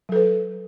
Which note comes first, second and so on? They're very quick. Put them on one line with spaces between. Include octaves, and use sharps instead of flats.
F#3 A4 B4